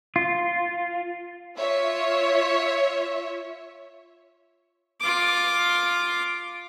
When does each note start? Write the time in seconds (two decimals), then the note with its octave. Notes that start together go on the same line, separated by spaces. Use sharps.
0.16 F4
1.57 F4 C#5 E5
5.01 F4 D6